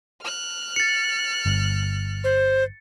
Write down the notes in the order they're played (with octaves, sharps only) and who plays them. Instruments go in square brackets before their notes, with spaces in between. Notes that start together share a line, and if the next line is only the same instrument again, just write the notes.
[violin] F6 F#6
[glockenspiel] A6 C#7
[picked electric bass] G1
[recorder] C5